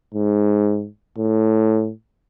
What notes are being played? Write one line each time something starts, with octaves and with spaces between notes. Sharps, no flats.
G#2
A2